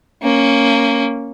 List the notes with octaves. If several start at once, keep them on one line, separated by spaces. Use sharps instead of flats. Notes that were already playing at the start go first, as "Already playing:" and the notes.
A#3 C#4